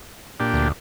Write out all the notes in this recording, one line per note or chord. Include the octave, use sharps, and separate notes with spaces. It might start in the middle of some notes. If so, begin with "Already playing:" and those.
A#2 D4 G4
D2